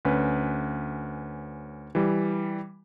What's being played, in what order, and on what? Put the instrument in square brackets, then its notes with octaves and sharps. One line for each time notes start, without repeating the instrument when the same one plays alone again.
[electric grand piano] D2 C#4 B4
E3 G3